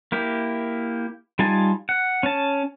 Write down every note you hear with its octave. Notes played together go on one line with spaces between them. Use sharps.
A#3 E4 G4
G3 D#4 F4 G#5 A5
F#5
C#4 A5